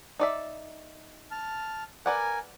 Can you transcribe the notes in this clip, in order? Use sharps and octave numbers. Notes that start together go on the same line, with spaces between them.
D#4 D5 E5
A5 F6
A#4 B4 D5 F#5 G#5